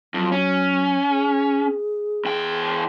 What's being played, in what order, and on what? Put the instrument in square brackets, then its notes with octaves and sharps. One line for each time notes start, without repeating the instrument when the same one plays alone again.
[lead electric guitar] F2 [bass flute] F#3
[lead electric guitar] C#4
[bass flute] G#4
[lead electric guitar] E2 G5